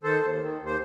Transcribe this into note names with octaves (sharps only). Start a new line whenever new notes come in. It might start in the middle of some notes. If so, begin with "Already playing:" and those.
D#3 A4 C5
D#2
D#3
D#2
C5